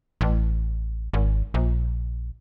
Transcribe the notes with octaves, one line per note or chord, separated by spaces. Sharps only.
A1
G#1
A#1